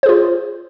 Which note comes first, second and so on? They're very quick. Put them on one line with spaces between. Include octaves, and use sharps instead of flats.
C5 G#4 F4